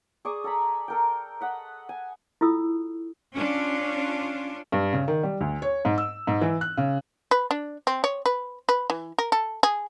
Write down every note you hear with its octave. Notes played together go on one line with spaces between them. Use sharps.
G#4 D5 C#6 D#6
A4 G#5 A#5 B5
A4 A#4 G5
D#5 F#5 B5
G#5
E4 F4 A4 D#6 E6
C#4 D4 F4
G2
C#3
D#3
G3
D2
C#5
G#2
E6
G#2
E3
F#6
C#3
B4
D4
C4
C#5
B4
B4
E3
A#4
A4
G#4